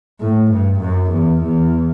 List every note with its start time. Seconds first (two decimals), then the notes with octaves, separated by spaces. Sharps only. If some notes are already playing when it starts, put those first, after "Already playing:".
0.20 A2
0.51 G2
0.81 F#2
1.12 E2
1.42 E2